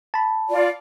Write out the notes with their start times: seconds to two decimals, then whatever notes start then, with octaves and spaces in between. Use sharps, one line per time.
0.14 A5 B5
0.49 F4 D5